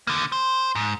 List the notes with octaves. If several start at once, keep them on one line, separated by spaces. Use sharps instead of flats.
D3 A#3
C5
G#2